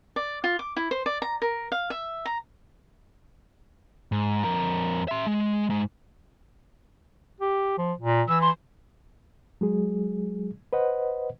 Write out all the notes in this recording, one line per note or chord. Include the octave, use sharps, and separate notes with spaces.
D5
F4
D6
E4
C5
D5
A#5
A#4
F5
E5
A#5
G#2
F2 A#4
E5 C6
G#3
G#2
G4
F3
A#2
E3 E6
C6
F#3 G#3 G#4
B4 C5 D#5 F#5